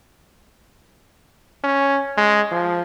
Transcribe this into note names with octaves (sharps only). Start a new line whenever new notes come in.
C#4
G#3
F3